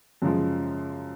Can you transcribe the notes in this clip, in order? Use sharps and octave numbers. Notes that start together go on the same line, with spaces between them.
F#2 C#3 F3 G#3